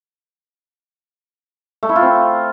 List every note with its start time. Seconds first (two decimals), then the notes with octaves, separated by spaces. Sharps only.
1.83 A3
1.89 E4
1.96 F4
2.02 C4